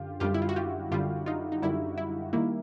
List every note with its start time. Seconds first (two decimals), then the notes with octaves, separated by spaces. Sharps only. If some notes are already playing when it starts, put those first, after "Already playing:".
Already playing: F#2 D3 F4 G4
0.20 F#2 D3 G3 F4 G4
0.34 E4
0.42 F4
0.49 F#4
0.56 F4 G4
0.91 F#2 D3 G3 F4 G4
1.26 D#4 F4
1.52 D#4
1.62 F#2 D3 G3 E4
1.98 E4
2.33 D#3 G3 A#3 E4